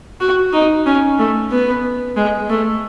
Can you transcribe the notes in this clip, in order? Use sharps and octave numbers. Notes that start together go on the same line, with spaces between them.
F#4
D#4
C#4
A3
B3
G#3
A3